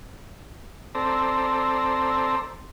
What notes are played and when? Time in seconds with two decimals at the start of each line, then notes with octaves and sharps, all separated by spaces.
0.95 C4 A4 C5 D5 A#5 E6